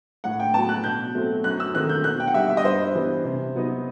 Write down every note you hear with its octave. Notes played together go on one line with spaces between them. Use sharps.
A2 F#5
G5
F#3 B3 A5
F#6
B2 G6
F#3 A3 C4
F#2 F#6
E6
D#3 A3 C4 D#4 F#6
G6
B2 F#6
G5
F#5
G3 D#4 E5
E5
D#5
G2 C5
E3 G3 B3
C3
F#3 B3 D#4